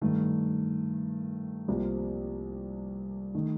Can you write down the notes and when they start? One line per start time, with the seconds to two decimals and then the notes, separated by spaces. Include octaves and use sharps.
0.01 G2 D#3 A3
1.68 C2 C3 F3 A#3
3.34 D#3 A3 D#4